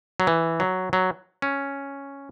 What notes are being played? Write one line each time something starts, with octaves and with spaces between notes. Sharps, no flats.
F#3
E3
F#3
F#3
C#4